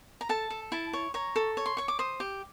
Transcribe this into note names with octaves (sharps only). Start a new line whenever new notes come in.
A#5
A4 A5
A4
E4 A5
C#5
C#5 A#5
A4
C#5
C6
C#5 C#6
D6
C5 D#6
G4